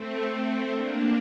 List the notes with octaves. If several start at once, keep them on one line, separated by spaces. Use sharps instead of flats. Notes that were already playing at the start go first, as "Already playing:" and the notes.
Already playing: A3 C4
A3 C4
A#3 D4